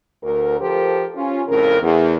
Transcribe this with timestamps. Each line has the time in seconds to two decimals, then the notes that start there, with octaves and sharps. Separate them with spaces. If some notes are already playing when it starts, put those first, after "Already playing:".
0.23 D2 A#4
0.60 F3 G4 A4 A#4 C5
1.15 C#4 F4
1.48 F2 A2 C#3 A#4
1.82 E2